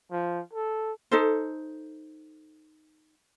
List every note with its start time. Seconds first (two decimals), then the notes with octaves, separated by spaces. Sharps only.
0.11 F3
0.53 A4
1.11 D#4 A4 C5